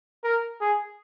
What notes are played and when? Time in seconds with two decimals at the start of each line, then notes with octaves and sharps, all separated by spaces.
0.24 A#4
0.61 G#4